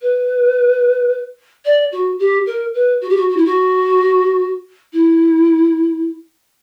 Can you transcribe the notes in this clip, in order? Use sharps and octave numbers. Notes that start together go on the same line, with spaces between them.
B4
D5
F#4
G4
A#4
B4
F#4
G4
F#4
F#4
E4
F#4
E4